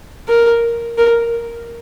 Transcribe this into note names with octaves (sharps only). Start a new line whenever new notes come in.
A#4
A#4